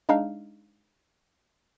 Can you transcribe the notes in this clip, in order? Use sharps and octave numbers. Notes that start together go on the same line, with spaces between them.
G#3 D4 D#4 F5